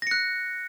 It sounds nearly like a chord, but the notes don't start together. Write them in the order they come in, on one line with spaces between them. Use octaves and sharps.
A#6 C#7 F#6